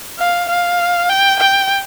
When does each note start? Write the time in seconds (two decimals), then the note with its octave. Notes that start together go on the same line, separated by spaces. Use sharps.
0.19 F5
0.49 F5
1.09 G5
1.39 G5